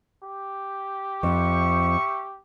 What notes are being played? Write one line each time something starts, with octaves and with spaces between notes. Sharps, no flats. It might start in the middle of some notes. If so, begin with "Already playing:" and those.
G4
F2 E5 C#6